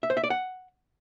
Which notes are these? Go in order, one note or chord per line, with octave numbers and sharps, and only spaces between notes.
E5
C5
E5
D5
F#5